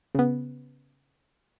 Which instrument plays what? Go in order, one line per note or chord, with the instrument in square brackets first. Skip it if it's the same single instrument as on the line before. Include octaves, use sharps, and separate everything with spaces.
[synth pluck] C#3 B3